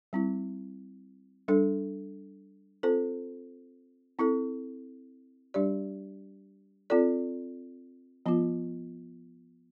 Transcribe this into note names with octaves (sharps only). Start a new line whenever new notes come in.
G3 C4 E4
G3 D4 A4
C4 F4 A4 C5
C4 E4 A4
G3 D4 G4 D5
C4 F4 A4 D5
F3 B3 F4